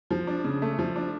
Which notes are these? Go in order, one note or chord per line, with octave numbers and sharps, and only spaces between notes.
F3
D4
C#3
A3
F3
D4